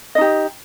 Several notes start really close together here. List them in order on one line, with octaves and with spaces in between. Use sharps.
D#5 D#4 G4